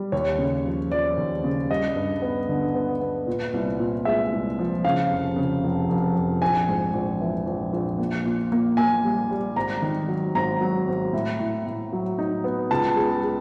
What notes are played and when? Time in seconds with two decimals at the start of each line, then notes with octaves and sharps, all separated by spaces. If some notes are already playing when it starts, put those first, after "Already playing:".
Already playing: G3
0.12 D#2 C#5
0.38 C#3
0.66 F3
0.92 F3 D5
1.17 D#2
1.44 C#3
1.70 G3 D#5
1.96 G2
2.22 B3
2.49 D3
2.74 B3
3.01 B3
3.27 A#2
3.54 C2
3.80 A#2
4.05 G#3 E5
4.32 C2
4.59 F3
4.85 C#3 F5
5.11 F1
5.36 C#3
5.64 F1
5.89 F1
6.16 F1
6.42 A#1 G#5
6.69 G#2
6.94 A#1
7.21 E3
7.46 A#1
7.73 A#1
7.99 A#3
8.25 A#2
8.52 A#3
8.77 A#3 G#5
9.04 G3
9.31 G3
9.56 G#1 A#5
9.82 D#3
10.09 F#3
10.35 G#1 A#5
10.61 F#3
10.88 G#1
11.13 A2
11.40 A2
11.66 A2
11.93 F#3
12.19 D#4
12.44 B3
12.71 C#2 A5
12.96 G#3
13.23 G#3